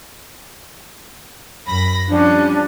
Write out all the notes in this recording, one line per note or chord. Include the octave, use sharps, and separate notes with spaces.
F#2 B5 A#6
F3 G3 C#4 D4